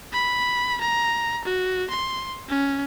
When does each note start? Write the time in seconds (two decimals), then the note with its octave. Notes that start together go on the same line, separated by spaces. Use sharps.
0.12 B5
0.81 A#5
1.44 F#4
1.90 C6
2.48 C#4